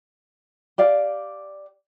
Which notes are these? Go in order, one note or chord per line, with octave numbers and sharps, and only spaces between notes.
G4 D5 F5